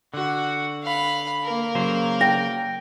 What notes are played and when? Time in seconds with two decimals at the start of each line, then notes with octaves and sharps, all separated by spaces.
0.14 D3 F#4 F#5
0.83 F5 B5
1.44 A#3 A#4
1.75 C#3 F#3 C5
2.21 G5 A#6